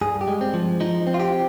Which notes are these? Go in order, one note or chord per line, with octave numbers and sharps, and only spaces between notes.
G2 G#4
G4
G#3
C4
F3
F3 D#4
C4
F4
G4